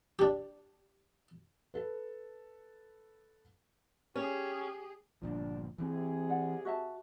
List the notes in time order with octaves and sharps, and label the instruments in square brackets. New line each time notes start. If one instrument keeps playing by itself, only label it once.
[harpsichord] D4 G4
[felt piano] A4 B4
[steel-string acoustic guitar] C#4 [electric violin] G4 G#4
[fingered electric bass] G1 A#2 F3 [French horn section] D4
[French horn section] C3 G#4 [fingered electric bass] E3 C4
[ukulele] D5 F#5
F#4 E5 A5